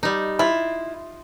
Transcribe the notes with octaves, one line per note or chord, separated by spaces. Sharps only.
G3 D#4
E4 F4